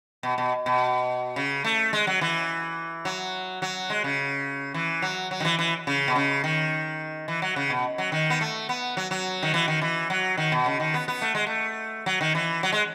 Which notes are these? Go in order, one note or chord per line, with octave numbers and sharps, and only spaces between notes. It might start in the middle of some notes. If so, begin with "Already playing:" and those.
B2
B2
B2
C#3
A3
G#3
F#3
E3
F#3
F#3
G#3
C#3
E3
F#3
F#3
D#3
E3
E3
C#3
B2
C#3
D#3
E3
F#3
C#3
B2
F#3
D#3
B3
A3
B3
F#3
F#3
D#3
E3
D#3
E3
F#3
D#3
B2
C#3
D#3
B3
B3
A3
G#3
A3
F#3
D#3
E3
F#3
G#3